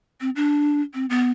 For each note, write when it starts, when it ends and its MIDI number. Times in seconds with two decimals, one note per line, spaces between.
0.21 0.30 60
0.36 0.81 62
0.94 1.06 60
1.10 1.31 59